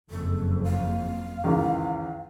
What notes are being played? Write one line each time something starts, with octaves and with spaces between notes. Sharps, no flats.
F#1 F2 A4
F5
C#2 D#3 E3